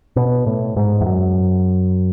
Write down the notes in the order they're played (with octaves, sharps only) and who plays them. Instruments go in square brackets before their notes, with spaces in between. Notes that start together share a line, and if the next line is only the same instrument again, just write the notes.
[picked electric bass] B2
A2
G#2
E2
F#2